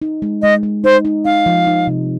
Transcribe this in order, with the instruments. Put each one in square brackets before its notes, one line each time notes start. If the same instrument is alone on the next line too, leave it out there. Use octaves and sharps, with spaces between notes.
[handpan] D#4
G#3
[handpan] G#3 [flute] D#5
[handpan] G#3
[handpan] D#4 [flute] C5
[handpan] D#4
[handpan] D#4 [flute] F5
[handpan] F3
D#4
C3